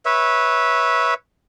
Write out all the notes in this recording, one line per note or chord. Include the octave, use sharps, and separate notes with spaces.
B4 C#5 E5